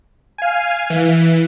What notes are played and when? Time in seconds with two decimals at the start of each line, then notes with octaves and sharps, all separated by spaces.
0.38 F5 G#5
0.90 E3